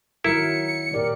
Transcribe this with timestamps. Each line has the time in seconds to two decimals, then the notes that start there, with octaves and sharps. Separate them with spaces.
0.24 D#3 F#3 E4 A#4 C#7
0.94 A#2 G4 A#4 D5